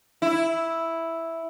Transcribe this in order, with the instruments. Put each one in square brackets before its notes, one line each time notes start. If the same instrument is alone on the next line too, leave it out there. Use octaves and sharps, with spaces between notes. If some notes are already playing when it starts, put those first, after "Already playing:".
[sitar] E4